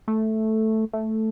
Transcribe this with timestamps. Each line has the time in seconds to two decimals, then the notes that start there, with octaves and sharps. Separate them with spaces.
0.08 A3
0.93 A3